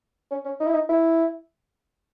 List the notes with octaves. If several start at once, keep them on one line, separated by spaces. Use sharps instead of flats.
C#4
C#4
D#4
E4
D#4
E4